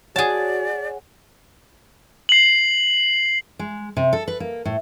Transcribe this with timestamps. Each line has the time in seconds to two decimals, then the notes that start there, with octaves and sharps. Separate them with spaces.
0.16 F#4 G#4 C#5 D5 F#5 G#5 A5
2.29 C7 F#7
3.59 G#3
3.97 C3
4.13 A4
4.28 B4
4.40 A#3
4.65 A2